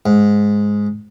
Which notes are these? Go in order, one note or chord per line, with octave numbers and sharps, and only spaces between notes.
G#2